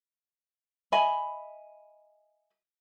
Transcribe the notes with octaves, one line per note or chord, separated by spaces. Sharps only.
D#5 E5 G#5 B5